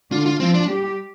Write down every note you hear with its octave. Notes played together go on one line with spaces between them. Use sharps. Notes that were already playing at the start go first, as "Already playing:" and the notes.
D3 D4 F4
F4
F3 C4 F4
D4
G3 G4